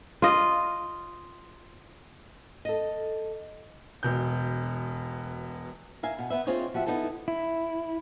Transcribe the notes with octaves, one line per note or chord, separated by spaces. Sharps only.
F4 D#5
A4 D#5
E1 B2 G6
A#4 E5 F5 G#5
B2
B3 B4 E5
C4 F4 G#4 C5 C#5 D#5
F3 F#4 G4 E5
B3 D#4 E4 A4 A5
E4